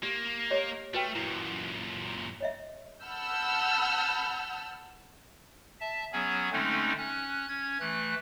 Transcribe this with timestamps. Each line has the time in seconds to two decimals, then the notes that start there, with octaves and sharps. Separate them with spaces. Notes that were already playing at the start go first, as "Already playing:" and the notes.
0.03 A#3 G4
0.50 G4 C#5 D#5
0.94 A3 F#4 B4 G5
1.15 F#2 A#2 E4
2.41 C#5 D#5 E5
3.04 F#5 A5 B5 E6 F6 G6
5.81 E5 A5
6.13 F#3 B3 C#4 G#4
6.52 D3 G#3 A3 C4 C#4 D#4
6.99 C#4 F#6
7.48 C#4 G#6
7.80 E3 A3 F#6